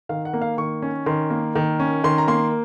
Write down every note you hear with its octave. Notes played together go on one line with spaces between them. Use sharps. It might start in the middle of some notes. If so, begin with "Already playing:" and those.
D#3 F5
F#5
A#3
F5
D#3 C#6
C#4
D#3 C6
A#3
D#3
C#4
D#3 C6
A#5
A#3 C6